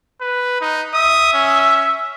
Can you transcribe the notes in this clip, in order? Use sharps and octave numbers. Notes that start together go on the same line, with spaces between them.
B4
D#4
E5 D#6
C#4